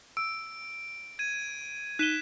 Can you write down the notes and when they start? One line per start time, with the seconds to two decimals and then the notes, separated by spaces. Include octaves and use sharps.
0.17 E6 D7
1.19 G#6 D#7
1.99 D#4 F#6 B6 D#7 E7 G7